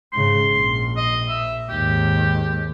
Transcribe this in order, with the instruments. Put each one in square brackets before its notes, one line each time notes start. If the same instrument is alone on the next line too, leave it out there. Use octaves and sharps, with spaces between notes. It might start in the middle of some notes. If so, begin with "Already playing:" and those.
[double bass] G#2 C#3 [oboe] C6
[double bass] A#1
[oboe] D#5
E5
[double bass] D#2 G#2 [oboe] G4